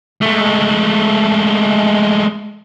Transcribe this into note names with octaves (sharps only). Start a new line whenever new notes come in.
G#3 A3